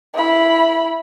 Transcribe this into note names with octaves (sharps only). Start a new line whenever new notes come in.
E4 B5